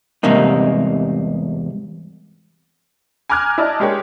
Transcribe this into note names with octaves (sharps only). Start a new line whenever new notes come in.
E2 G#2 C3 G3 A#3 D#4
G#5 A#5 D6 F6 F#6 G#6
E4 D5 D#5 A5
G#3 D4 G4 G#4 A#4 C#5